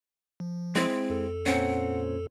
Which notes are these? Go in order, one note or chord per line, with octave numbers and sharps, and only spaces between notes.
F3
G#3 C4 E4 C5
F2 A4
A#2 C4 C#4 F#5